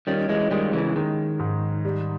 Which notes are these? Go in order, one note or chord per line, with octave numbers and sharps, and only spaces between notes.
D#3 G3 C#4
E3 G#3
D#3 G3 G#3
C#3 E3
D#3 G#3
G#2
G3